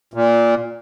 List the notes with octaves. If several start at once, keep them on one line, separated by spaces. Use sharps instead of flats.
A#2